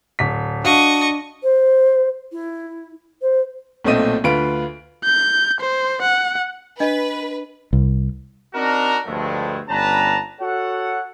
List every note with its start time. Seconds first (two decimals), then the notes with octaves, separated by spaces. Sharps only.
0.19 D1 B6
0.64 D4 F#4 D#5 F5 C#6
1.43 C5
2.32 E4
3.22 C5
3.84 B1 A#2 A3 C4 D#5 D#7
4.24 D2 F4 B4 F5 D7
5.04 G6
5.60 C5
6.02 F#5
6.80 D4 B4 D#5
7.73 C2
8.55 C4 D4 D#4 F#4 A#4
9.06 D2 G2 F3 G#3 A3
9.69 G1 G3 C#4 B4 A5 A#5
10.41 F#4 A4 C#5 F#5